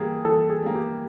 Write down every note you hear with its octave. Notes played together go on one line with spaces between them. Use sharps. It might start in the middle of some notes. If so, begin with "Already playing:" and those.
Already playing: E3 G3 A#3 G#4
E3 A4
G#4
G3 A#3
G4